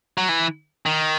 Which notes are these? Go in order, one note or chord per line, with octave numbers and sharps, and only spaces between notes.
F#3
E3
D#3